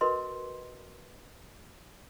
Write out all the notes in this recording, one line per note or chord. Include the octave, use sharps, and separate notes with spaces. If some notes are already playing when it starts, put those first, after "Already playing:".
F#4 A#4 B4 D#5 C6